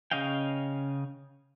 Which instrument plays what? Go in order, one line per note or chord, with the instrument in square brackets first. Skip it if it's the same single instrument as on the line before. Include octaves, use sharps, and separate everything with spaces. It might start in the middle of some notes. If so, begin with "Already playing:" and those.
[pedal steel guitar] C#3 C#4 D#5 F5 G5